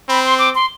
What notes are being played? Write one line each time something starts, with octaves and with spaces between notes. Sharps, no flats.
C4 B5
C6
D6
C6